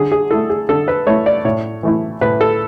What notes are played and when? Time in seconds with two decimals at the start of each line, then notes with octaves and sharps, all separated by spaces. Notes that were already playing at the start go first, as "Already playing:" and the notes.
Already playing: D3 G#4
0.12 G#4
0.31 A3 E4 A4
0.50 G#4
0.69 D3 A4
0.88 B4
1.07 A3 E4 C#5
1.26 D5
1.45 A2 C#5
1.83 E3 A3 E4
2.21 A2 B4
2.41 A4